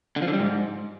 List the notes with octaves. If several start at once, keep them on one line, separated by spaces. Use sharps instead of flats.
D3
F3
D3
G3
G#2